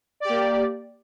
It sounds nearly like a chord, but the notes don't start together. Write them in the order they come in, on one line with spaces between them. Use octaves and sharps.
D5 G4 A#3